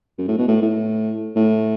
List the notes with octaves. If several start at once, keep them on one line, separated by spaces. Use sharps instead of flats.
F#2
A2
B2
A2
A2
A2